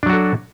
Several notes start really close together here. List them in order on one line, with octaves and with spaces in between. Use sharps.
D4 F#3 F#4 A4